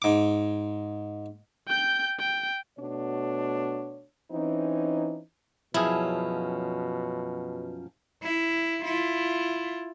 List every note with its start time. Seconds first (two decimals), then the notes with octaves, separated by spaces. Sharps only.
0.02 G#2 D6
1.68 G5 G6
2.19 G5
2.79 B2 A3 D4 F#4 C#5
4.31 E3 C4 C#4 D#4
5.74 F#2 B2 F3 C#4 E4 G#4
8.23 E4
8.83 E4 F4